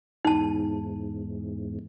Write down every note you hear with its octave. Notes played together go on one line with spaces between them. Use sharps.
E2 G#2 D#4 A5